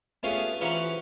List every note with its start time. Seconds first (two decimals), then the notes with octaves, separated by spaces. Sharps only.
0.23 A3 B3 C#4 F4 G4 G#4
0.60 E3 F3 C#4 G4 F#5 A#5